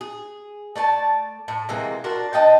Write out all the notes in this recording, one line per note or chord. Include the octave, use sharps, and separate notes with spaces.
G#4
A3 D5 G5 A5
A2
C3 E3 G#3 A#3
D4 F#4 A#4 C5
D4 D#5 G5 A5